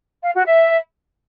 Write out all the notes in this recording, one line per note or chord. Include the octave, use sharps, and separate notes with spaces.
F5
F#4
E5